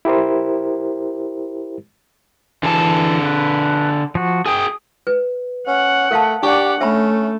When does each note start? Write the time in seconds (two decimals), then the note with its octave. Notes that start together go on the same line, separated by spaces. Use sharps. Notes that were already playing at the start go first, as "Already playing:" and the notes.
0.05 E4 G4 A#4 C5
2.63 D3 E3 G#4 A5
3.25 B4
4.15 F3 F#4
4.46 G#4 G5 D#6
5.07 B4
5.67 C#4 F#5
6.11 A3 A#4 F5 A5
6.43 D4 G4 D5 F#5 C#6
6.80 A3 C#4 E5 B5